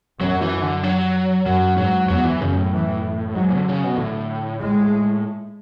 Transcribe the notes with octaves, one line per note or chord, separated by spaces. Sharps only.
F#2 F#3
E3
D3
F#3
F#2 F#3
G#2 F#3
E2 F#3
E3
F#2 C#3
A2
E3
G#2 F#3
D3
C#3
B2
A2 D3
G#3